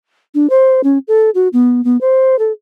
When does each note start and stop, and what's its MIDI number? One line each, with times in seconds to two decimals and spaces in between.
0.35 0.50 62
0.50 0.81 72
0.84 0.98 61
1.08 1.30 69
1.35 1.48 66
1.53 1.83 59
1.84 1.99 59
2.01 2.38 72
2.39 2.52 69